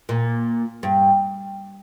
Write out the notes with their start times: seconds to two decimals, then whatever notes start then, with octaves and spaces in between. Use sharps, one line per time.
0.09 A#2
0.83 G2